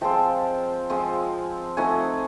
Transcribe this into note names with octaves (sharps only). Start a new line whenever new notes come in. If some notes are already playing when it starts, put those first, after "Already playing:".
F3 G#3 C4 F4 G5 A5
F3 G#3 C4 F4
F3 A3 C4 D#4 F#5 G#5